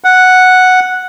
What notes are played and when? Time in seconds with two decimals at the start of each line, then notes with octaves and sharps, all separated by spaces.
0.04 F#5